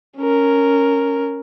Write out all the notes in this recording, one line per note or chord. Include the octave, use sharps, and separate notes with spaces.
C#4 A#4